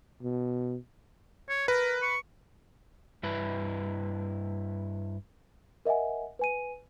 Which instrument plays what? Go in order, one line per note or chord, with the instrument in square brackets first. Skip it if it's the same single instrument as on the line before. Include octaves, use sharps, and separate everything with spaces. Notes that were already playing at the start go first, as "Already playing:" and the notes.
[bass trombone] B2
[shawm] C#5
[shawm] A#4 [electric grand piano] B4
[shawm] C#6
[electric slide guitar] G2 E4 B4
[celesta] A#4 D#5 E5 F#5 G#5
B4 G#5 D#7